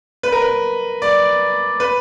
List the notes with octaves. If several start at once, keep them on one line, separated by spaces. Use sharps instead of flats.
B4
A#4
B4
D5
B4